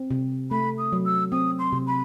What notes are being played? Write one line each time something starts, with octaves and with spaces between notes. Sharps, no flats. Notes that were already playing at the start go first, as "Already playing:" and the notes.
Already playing: C4
C3
A3 B5
D#6
F#3
E6
C4 D#6
C6
C3
B5